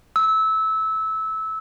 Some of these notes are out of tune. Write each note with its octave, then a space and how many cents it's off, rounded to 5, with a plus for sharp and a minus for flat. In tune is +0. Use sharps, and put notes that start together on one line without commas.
E6 -20